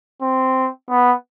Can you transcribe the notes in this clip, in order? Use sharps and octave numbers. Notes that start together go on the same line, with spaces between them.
C4
B3